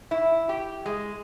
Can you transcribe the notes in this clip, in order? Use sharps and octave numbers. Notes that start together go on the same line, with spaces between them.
E4
G4
G#3